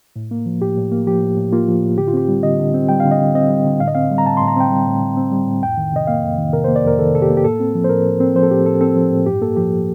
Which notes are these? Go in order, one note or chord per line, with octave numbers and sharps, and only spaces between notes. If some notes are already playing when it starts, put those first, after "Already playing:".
A2
A#3
F3
A2 G4
A2
A#3
F3 G4
A2
A2
A#3 F4
F3
A2
D3 G4
F4
C4 G4
G3
D3 D#5
D3
C4
G3 G5
F5
D3
D#5
D3
C4 D#5
G3
D3
A2 F5
D#5
C4 F5
G3
A#5
A2 A5
C6
A2
A#5
C4 G5
G3
A2
A2
C4
G3
A2
F2 G5
D#3
C3 D#5
A#3 F5
F2
D#3
C3 A#4
C5
A#3
D5
F2 A#4
D#3 A4
C3 A4
G4
A#3
G4
A2 A4
C4
F3
C5
A2 A#4
A2
C4
F3 C5
A4
A2 G4
A2 A4
C4 A4
F3
A2
G2 G4
A#3 A4
F3 G4